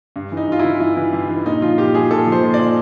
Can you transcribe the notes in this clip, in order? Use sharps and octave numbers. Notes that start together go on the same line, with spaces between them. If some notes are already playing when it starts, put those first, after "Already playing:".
G2
E3
D#4
G2 F4
E4
E3
G2 E4
E3
G2
E3
A#2 D#4
F3 F4
A#2 G4
F3 G#4
A#2 A4
F3 C5
A#2
D5
F3